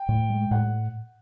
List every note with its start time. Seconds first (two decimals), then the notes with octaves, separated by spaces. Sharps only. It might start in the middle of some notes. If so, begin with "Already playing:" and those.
Already playing: G5
0.09 A2
0.30 G#3
0.51 A2 F#5